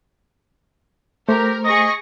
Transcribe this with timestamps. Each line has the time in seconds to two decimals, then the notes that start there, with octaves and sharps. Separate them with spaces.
1.29 A3 G4 A#4 C5
1.65 G#4 D#5 C#6 A#6